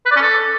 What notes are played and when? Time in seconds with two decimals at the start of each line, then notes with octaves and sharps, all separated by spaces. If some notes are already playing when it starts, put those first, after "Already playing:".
0.06 B4
0.11 D5
0.16 C#4
0.21 A4